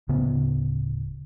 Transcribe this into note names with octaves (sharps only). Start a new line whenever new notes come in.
D1 C#3 B3